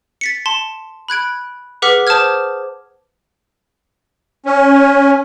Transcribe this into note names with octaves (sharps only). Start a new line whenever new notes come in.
A6 B6 C#7
A5 C6
B5 F#6 G#6 D7
G#4 B4 F#5 D6 F6 B6
C5 A5 D6 D#6 F6 G#6
C#4